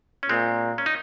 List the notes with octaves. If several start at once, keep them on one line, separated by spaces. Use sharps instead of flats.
C#4
A#2 G#3 C4
C#4
D#4